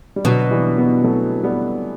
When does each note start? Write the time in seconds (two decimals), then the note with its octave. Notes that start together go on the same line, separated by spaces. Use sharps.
0.16 G3
0.25 B2 D3 F#3
0.51 E3 G3
0.78 G3 B3
1.04 F#3 A3
1.43 G3 B3